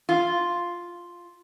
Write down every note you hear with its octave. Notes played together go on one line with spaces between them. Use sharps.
F4